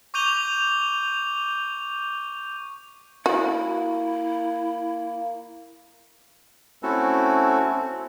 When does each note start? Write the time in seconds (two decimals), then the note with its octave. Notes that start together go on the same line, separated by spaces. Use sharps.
0.14 C#6 D6 G6 D#7 F7 G7
3.26 A#3 E4 F#4
6.83 A3 C4 C#4 E4 F#4 A4
7.70 C4